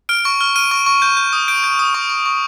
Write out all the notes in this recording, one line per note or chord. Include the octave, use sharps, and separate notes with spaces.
F6 D7
C#6
F6
F6 D#7
C#6
C#6
G6
G6
D#6
G6 D7
G6
D#6
C#6
C#6
C#6